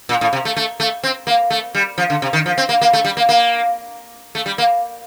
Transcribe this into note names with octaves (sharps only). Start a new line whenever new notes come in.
A#2
A2
C3
A3
A3
A3
C4
A#3
A3
G3
F3
D3
C3
D#3
F3
C4
A#3
A#3
A3
G3
A#3
A#3
A3
G3
A#3